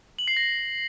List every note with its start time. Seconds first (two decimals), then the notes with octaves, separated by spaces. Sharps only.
0.19 F#7
0.28 C7
0.37 A#6